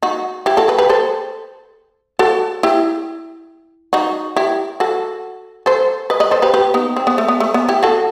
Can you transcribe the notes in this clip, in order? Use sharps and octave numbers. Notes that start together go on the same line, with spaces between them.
D#4 F#4
E4 G4
F#4 A4
G4 B4
G4 B4
A4 C5
F#4 A4
E4 G4
D#4 F#4
E4 G4
F#4 A4
A4 C5
B4 D#5
B4 D#5
A4 C5
G4 B4
G4 B4
B3 D#4
C4
B3
A3
B3
A3
B3
E4 G4
F#4 A4